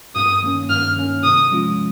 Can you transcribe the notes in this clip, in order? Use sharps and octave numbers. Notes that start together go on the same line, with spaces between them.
G2 D#6
D#3 A#3 C#4
G2 F6
D#3 A#3 C#4
C3 D#6
F3 G#3 C#4 F4